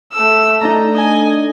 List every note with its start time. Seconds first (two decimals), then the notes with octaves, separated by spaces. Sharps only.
0.13 A3 E6
0.61 A3 D4 D#4 A#5
0.93 D#5 G#5